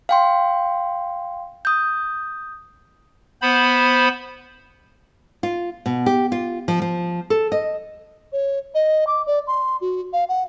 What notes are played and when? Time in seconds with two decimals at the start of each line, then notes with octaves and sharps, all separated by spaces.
0.09 F5 G5 C6
1.65 D#6 G6
3.42 B3 C5 B5
5.43 F4
5.86 B2
6.06 G4
6.32 F4
6.68 F3
6.82 F3
7.30 A4
7.52 D#5
8.32 C#5
8.74 D#5
9.07 D6
9.27 D5
9.47 C6
9.81 F#4
10.13 F5
10.29 F#5